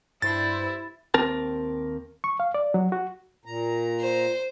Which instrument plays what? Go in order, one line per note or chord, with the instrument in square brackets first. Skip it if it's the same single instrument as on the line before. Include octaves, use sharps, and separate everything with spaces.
[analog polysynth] G2 C5 [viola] E4 [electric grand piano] A6
[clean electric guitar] D#2 C4 A#4 A5
[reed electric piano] C#6
F5
D5
F#3
F#4
[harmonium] A#2 A#5
[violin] C5